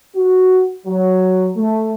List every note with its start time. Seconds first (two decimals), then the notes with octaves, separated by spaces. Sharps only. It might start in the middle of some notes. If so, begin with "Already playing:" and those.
0.16 F#4
0.87 F#3
1.56 A3